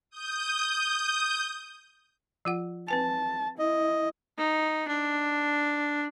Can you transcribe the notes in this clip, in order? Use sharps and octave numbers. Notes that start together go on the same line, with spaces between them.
D#6 G6
F3 F4 F#5
C4 B4 G#5 A5
E4 D#5
D#4
D4